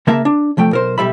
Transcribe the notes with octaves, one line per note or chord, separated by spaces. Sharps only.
C#3 A#3 A#4 E5 A5
D4
C2 F3 A3 G5
B1 A#4 C5
B1 G3 E5 B5